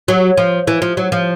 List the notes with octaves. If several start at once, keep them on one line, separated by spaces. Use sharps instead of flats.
F#3
F3
E3
F3
F#3
F3